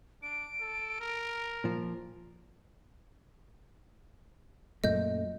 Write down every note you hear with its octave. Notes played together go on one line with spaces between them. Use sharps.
D4 D7
A4
A#4
A#2 F3
F#2 A#2 A3 D#5 G6